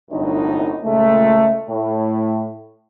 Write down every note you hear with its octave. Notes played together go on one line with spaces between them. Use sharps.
G1 C2 F#2 A2 D4 D#4
C#2 A#2 G#3 A3
A2